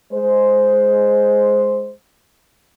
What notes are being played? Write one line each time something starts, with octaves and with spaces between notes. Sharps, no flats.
G#3 C5